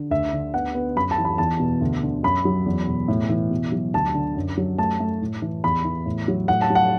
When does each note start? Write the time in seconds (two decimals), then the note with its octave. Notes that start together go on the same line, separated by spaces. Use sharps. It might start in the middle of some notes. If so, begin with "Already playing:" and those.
Already playing: D3
0.11 D2 E5
0.33 D3
0.54 B3 F#5
0.75 B3
0.96 F#2 B5
1.11 A5
1.18 E3
1.25 B5
1.38 E2 A5
1.59 B2
1.81 D2
2.03 D3
2.23 F#2 B5
2.45 F#3
2.66 E2
2.87 B2
3.08 A2
3.29 E3
3.51 B2
3.72 F#3
3.94 D2 A5
4.14 D3
4.36 F#2
4.57 F#3
4.78 A3 A5
5.00 A3
5.22 A2
5.42 E3
5.64 E2 B5
5.84 E3
6.06 A2
6.28 F#3
6.48 A2 F#5
6.62 A5
6.70 F#3
6.75 F#5